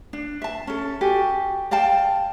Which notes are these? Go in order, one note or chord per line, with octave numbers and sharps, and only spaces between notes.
D4
E5 A5
C#4 A4
F#4 G4 A4 G#5
D5 F5 G5 A5